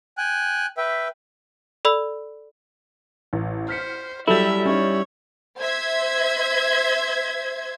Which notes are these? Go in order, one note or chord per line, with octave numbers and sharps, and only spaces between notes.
G5 G#5 F#6
B4 E5 G5
A4 D5 B5 E6
A1
C5 F6 B6 C#7
F#3 G3 E4 A4 E5
C#4 D#4 C#5
C5 E5 G#6